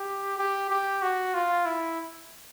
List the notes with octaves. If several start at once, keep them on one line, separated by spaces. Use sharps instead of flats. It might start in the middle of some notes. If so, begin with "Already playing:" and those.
Already playing: G4
G4
G4
F#4
F4
E4